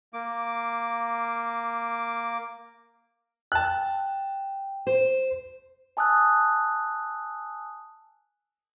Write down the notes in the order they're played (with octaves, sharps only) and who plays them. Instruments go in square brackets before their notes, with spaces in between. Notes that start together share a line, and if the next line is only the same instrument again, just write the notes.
[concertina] A#3 D6
[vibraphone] G5 [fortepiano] A5 F#6
[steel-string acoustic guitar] C5
[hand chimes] G#5 A5 D#6 E6 F#6